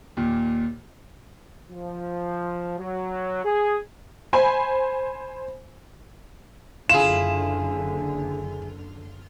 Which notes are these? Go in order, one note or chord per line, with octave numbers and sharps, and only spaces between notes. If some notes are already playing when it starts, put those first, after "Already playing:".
D#2 A#2
F3
F#3
G#4
C5 G#5 B5
F#1 D3 E4 F4 G#4 E7